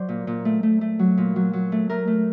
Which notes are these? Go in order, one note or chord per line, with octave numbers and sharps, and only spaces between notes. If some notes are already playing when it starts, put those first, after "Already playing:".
Already playing: F#3 C5 D5
A#2
A#2
A3
A3
A3
F#3
A#2
F#3
F#3
A3
A3 A#4
A3